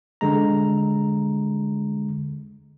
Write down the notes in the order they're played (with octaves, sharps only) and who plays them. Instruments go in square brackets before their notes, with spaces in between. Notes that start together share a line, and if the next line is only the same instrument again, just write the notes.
[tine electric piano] D3 G#3 A#5